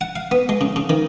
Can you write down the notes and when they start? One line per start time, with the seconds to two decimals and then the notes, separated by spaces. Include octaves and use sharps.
0.01 F#5
0.16 F5
0.31 B3
0.49 G#3
0.61 C#3
0.76 C#3
0.90 D#3